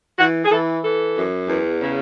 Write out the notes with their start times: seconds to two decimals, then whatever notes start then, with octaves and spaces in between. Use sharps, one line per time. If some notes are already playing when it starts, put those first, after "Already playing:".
0.18 E3 F#4
0.45 G#4
0.50 E3 A4
0.83 E3 A4
1.15 F#2
1.48 E2
1.80 C#3